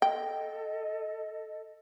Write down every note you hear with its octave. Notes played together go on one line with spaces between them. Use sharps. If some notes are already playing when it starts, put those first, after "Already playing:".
A4 D#5 G5